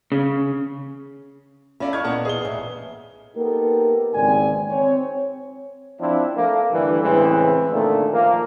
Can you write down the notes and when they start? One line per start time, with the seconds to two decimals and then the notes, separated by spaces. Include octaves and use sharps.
0.12 C#3
1.80 C#4 F4 A4 D5 E5 F5
1.93 E4 D#5 C#6 F6 G#6
2.04 A#2 B3 A4 F#5 A5
2.25 G#4 B4 D#5 D#6 G7
2.45 A1 E5 G#5
3.36 A#3 B3 D#4 G4 A4 A#4
4.14 G#1 E2 C#3 C4 D5 G#5
4.70 C4 C#5
5.99 F3 C4 D4 E4
6.35 A3 A#3
6.72 G2 D3 E3 G3 A3
7.02 A2 C#3 E3 G#3 C4
7.71 A#2 D3 D#3 A3
8.11 F3 A#3